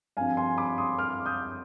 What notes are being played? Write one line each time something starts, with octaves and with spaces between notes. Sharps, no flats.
G2 F3 C4 F5 G#5
G#5 C6
B5 D6
C6 D#6
D6 F6
D#6 G6